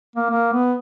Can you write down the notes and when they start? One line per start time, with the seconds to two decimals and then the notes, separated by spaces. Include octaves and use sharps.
0.16 A#3
0.30 A#3
0.53 B3